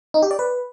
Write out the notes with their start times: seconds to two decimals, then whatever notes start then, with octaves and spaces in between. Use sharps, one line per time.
0.14 D#4
0.22 G4
0.31 D5
0.39 B4